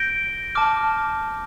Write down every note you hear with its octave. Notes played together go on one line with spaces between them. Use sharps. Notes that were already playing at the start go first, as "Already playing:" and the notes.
Already playing: G6 A#6 D7 G7
A5 D6 F6